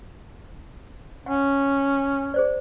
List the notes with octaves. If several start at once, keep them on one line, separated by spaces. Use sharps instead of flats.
C#4 F#5
G#4 C5 D5